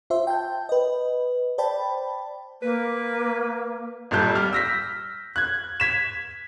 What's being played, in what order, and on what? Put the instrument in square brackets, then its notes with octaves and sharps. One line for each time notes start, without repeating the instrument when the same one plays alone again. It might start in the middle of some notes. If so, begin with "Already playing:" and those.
[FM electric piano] F4 C5 E5 C6
G5 A5 G6
B4 D#5
C5 D5 G5 A5 B5
[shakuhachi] A#3 [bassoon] B4
[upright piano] G#1 A#2 G3 A4 G6
G3 F6
E6 A#6 B6
F#6 G#6
G#6 B6 E7